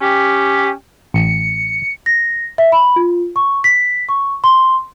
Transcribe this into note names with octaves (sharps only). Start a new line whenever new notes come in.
C#4 G4
A1 C#7
A#6
E5
B5
F4
C#6
B6
C#6
C6